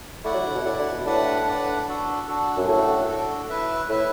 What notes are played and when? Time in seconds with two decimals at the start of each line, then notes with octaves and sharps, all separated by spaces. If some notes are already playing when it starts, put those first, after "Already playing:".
0.24 A3 E4 D5 F#5
0.34 F#3
0.45 D3
0.55 B2
0.65 A2 E4 D5 F#5
0.79 D3
0.92 B2
1.05 A2 D4 B4 D5 F#5
1.46 D4 B4 D5 F#5
1.87 D4 F#4 A4
2.27 D4 F#4 A4
2.57 F#2
2.68 A2 D4 F#4 A4
3.09 D4 F#4 A4
3.49 E4 B4 E5
3.89 A2 E4 B4 E5